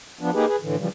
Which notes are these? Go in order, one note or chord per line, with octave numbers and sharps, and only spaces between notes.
F3 B3 D4
A#3 D#4 G4 G#4 B4
G#4 B4
A2 D3 E3
C#3 E3 F3 G3